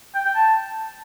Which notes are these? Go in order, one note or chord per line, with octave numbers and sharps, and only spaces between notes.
G5
G5
A5